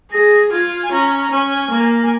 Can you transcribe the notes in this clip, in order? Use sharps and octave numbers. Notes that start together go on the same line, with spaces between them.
G#4 A#6
F4 G#6
G#5
C#4 A#5
A#5
C#4 G#5
A#3
G#5